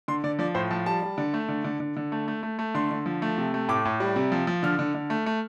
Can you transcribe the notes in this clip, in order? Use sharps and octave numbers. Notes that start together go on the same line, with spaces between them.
D3 C6
D3 D5
F3 D5
A2 C5
F3 A5
G3 A5
G3
D3
A3
D3
D3
D3
D3
A3
A3
A3
A3
D3 C6
D3
F3
A3
C3
A3
A2 D6
A2
G3
C3
F3
F3
D3 F6
D3
D3
A3
A3